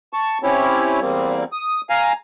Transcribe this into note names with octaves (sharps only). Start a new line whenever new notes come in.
A5 C#6
C4 C#4 E4 G4 C#5
E2 G3 A#3 C4
D#6
F5 G#5 A#5